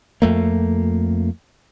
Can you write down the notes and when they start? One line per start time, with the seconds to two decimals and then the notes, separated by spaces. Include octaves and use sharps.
0.22 F2 A3 A#3